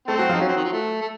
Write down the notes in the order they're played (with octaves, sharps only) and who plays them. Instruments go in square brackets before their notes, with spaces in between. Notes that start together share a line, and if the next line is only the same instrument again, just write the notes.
[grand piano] A3 A4 [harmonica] C4
[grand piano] F#3 F#4
F3 F4
[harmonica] D#4
[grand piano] F#3 F#4 [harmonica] C#4
[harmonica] C4
D#3
F3
A3
A3